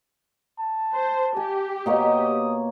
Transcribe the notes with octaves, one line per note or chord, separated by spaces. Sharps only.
A5
C5
G4 G#5
B2 A#3 C#5 D#6